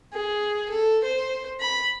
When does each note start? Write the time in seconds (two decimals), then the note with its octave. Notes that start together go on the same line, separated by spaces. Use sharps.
0.13 G#4
0.70 A4
1.04 C5
1.61 B5